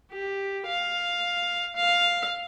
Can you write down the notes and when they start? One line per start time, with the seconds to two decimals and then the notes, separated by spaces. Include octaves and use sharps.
0.12 G4
0.67 F5
1.76 F5